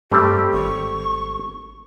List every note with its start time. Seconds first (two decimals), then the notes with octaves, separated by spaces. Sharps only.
0.11 G2 G3 A3 C4 G4
0.53 G#1 C#6